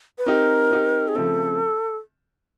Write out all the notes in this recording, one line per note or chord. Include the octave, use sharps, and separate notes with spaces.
B4
C4 D#4 G4 A#4
C4 D#4 G4
G#4
C#3 F3 A3 C4 A4